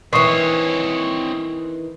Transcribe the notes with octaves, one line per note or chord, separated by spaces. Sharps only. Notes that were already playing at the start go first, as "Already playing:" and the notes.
D#3 E3 C4 C#5 C#6 D#6 C7